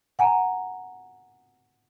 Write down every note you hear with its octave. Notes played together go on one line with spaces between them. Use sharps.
F#5 G#5 A#5